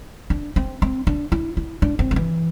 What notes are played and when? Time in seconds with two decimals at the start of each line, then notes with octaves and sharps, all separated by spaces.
0.30 D4
0.56 C4
0.82 C4
1.07 D4
1.32 E4
1.57 E4
1.82 D4
1.99 C4
2.11 F3
2.16 E3